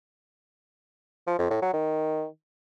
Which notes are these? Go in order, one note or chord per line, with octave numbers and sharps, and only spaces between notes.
F3
F2
A2
F#3
D#3